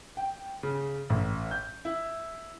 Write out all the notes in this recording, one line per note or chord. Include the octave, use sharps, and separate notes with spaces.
G5
C#3
A1
G6
E4